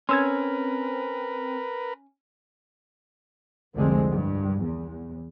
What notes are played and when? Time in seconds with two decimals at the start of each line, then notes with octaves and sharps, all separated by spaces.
0.09 C4 C#4 A#4 B4 C6 E6 G#6
3.73 C2 F2 D3 G3 G#3 C4
4.07 C2 G2
4.61 E2